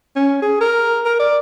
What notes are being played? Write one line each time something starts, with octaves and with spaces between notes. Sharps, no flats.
C#4
G#4
A#4
A#4
D5